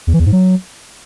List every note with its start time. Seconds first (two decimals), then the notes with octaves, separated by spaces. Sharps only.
0.07 E2
0.13 E3
0.20 E2
0.26 G#2
0.32 F#3